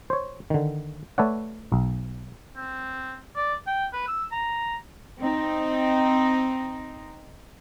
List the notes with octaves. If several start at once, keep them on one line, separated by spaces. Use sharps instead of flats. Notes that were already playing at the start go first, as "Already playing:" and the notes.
C5 C#5
D3 D#3
A3 A4 B4 C#5 D5 F#5
B1
C4
D5
G5
B4
E6
A#5
C4 D#4